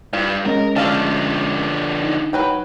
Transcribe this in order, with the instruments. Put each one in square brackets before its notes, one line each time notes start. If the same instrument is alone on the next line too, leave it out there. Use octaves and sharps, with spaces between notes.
[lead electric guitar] G2 [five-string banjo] F4
[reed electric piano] G#3 C#4 D#5 [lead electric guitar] A#4
[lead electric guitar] D3 F3 [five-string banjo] A3 F5 A5
[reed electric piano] D#4
[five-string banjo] F#3 B4 G5